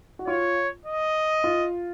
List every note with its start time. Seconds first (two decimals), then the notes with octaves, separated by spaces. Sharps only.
0.19 F#4
0.27 F4 C#5
0.85 D#5
1.44 F4